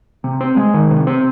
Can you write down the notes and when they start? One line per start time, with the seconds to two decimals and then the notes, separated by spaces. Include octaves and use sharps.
0.24 C3
0.41 C4
0.56 G#3
0.74 D#3
0.90 C3
1.07 C4